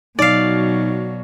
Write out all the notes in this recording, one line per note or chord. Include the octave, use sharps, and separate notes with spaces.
B2 F#3 D#4 D5 F5